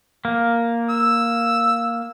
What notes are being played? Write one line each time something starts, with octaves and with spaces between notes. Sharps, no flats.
A#3
E6